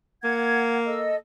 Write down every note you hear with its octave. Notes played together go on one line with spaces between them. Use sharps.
A#3 F#5 G#6
A4 D#5 E6